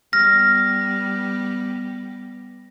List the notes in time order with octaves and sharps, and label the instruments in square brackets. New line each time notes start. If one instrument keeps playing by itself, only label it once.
[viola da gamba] G3 B3 [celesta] F6 [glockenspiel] A#6